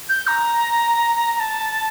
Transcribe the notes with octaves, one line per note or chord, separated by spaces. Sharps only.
G6
A#5
A5